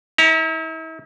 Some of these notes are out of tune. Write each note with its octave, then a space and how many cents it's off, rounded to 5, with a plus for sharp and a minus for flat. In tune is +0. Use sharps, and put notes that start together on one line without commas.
E4 -40 A#5 +0